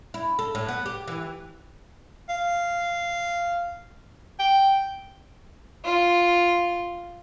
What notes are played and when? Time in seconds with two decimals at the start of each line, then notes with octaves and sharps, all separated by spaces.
0.14 E4
0.39 A4
0.55 A2
0.68 B3
0.86 G4
1.08 E3
2.29 F5
4.39 G5
5.85 F4